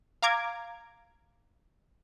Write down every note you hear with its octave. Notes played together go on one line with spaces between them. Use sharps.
F5 A#5 D6 G#6